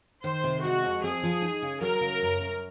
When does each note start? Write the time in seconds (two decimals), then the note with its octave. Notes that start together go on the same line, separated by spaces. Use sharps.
0.24 D#3 C5
0.44 C3
0.64 G#3 F#4
0.84 F2
1.03 C4 G#4
1.23 F3
1.42 D#4
1.62 C#3
1.81 F#3 A#4
2.01 C#3
2.21 F#2
2.41 F#2